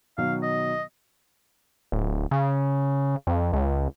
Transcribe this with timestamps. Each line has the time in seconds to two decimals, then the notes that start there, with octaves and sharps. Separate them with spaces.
0.18 B2 D#3 F#3 F5
0.43 D#5
1.92 D1
2.31 C#3
3.27 F2
3.53 C#2